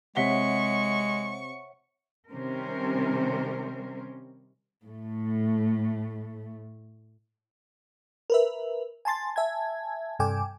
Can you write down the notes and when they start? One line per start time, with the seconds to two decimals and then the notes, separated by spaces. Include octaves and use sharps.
0.17 C3 G#3 C#5 E5 F#5 C#6 B6 G7
2.30 C3 D#3 G3 C#4 A#4 C5
4.86 A2 A3
8.30 A#4 B4 E5
9.05 G#5 A5 C6 A6
9.36 E5 G#5 A5 G#6
10.19 G2 C3 A4 G5 G#5 D6